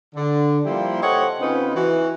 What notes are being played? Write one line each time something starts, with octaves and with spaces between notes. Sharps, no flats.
D3
F3 G3 A#3 E4 G4 C5
G4 A4 C5 C#5 D#5 F#5
C#3 C4 C#4 D#4 F4 B4
E3 F#4